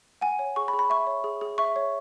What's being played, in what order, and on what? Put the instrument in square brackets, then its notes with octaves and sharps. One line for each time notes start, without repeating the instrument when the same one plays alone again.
[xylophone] F#5 G#5
C#5
G#4 C#6
B5
G#4
B5
E5 C#6
C#5
G#4
G#4
E5 C#6
C#5